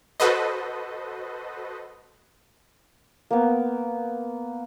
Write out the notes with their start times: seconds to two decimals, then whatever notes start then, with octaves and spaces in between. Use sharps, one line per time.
0.20 F#4 A4 B4 C5 D#5
3.31 A#3 B3